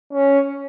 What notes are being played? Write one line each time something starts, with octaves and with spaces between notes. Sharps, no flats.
C#4